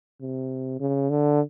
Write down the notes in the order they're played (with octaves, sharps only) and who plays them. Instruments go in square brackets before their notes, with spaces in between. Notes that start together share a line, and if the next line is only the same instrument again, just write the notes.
[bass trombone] C3
C#3
D3